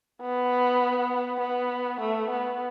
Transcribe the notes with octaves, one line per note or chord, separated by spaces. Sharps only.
B3
B3
A3
B3